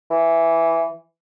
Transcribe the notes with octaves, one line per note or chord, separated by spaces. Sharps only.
E3